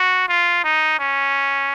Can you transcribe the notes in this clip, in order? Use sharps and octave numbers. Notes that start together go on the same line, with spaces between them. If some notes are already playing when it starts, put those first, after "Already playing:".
Already playing: F#4
F4
D#4
C#4